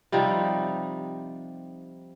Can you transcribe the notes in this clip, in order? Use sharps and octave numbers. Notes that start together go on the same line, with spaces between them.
C3 F3 G3 D#4